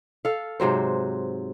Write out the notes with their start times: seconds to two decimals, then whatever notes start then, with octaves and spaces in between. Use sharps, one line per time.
0.25 A4 F5
0.60 G#2 C3 F#3 C5